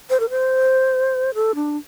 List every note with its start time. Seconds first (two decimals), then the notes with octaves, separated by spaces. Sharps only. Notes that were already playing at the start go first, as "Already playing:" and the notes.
0.10 C5
0.20 A#4
0.30 C5
1.34 A4
1.55 D4